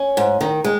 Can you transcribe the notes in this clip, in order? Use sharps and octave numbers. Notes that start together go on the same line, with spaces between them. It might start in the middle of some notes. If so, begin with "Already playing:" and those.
Already playing: C#4
G#2
D#3
G#3